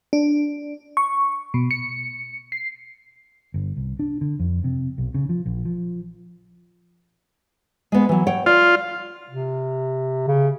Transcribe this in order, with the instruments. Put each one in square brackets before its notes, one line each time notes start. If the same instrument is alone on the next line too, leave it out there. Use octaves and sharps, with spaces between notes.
[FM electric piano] D4
C#6
B2
C#7
C7
[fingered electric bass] G1
C2
D4
D3
F2
C3
B1
C#3
F3
A#1
F3
[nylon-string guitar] G#3 B3
E3 F#3
C#5 F#5 G5
[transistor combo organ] F4 [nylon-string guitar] D5
[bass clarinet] C3
C#3